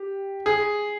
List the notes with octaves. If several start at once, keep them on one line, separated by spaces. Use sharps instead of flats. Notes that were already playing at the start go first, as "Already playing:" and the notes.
Already playing: G4
G#4